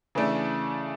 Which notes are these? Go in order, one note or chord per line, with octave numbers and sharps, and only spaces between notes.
C#3 E3 A3 D4